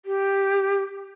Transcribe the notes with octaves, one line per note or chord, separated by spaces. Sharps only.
G4